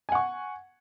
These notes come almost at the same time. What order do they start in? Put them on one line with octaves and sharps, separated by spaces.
G#5 F#5 C#6